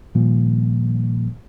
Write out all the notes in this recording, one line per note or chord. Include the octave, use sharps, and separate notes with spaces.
A#2 D#3 F3 G3 A#3